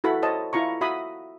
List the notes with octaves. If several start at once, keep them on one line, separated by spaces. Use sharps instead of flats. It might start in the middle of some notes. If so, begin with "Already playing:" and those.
E4 F#4 A4 B5
C5 C#5 D#5 A5
E4 F4 A#5 C#6
F#4 E5 B5 D#6